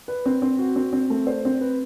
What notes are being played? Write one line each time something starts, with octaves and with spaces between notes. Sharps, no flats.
B4
C4
C4
F#4
C4
C4
A3
C5
C4
B4